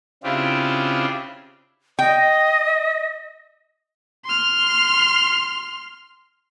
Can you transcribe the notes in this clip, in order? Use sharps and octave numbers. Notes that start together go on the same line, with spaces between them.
C#3 C4 D4 E4 F4 G4
D#5 G5
C6 F6